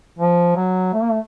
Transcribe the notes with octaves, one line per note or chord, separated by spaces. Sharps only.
F3
F#3
A3
A#3
A3